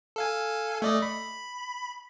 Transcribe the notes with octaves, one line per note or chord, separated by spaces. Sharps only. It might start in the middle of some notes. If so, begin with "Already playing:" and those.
A4 F5 G#5
A3 D5 D#5
B5